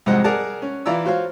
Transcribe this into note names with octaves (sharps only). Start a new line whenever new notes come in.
C2 F2 G#2 G#3 C5 F#5
G#4 A#4 D5 F#5 A5
C#4
E3 E4 F4 D5 A#5 E6
F4 F#4 C5 C#5 F5